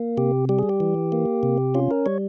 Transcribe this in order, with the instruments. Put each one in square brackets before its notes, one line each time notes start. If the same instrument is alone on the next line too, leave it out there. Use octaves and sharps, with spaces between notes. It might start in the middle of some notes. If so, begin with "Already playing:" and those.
Already playing: [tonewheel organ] A#3
C3 G4
G3 G4
G#4
G4
E3
A#3
C3
C#4 F4
A#4
G3 C#5